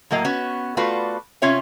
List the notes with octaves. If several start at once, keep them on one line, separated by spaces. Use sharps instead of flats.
A2 F#3 A#3 D#5
B3 C#4 F#4
A3 F4 F#4 B4 D5
C3 C#4 F4 C#5 E5